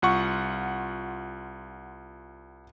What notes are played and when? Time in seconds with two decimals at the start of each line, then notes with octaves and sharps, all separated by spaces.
0.02 C2 F4 F#5 C#6